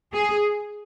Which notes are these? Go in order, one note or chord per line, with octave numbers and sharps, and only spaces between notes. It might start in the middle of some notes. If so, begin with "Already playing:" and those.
G#4